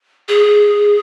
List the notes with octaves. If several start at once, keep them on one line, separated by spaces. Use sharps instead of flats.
G#4